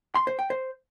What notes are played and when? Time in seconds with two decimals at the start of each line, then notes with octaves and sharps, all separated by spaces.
0.15 C6
0.27 C5
0.39 G5
0.50 C5